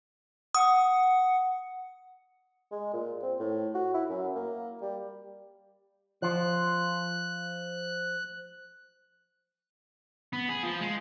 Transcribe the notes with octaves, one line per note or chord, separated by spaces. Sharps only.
F#5 D#6
G#3
A#2
C4
A2
F#4
E4
F#2
A#3
G3
F3 F4 F#6
B3
G#4
F3
G#3